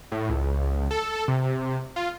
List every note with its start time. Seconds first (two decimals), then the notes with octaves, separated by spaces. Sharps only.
0.12 A2
0.29 C#2
0.91 A4
1.28 C3
1.96 F4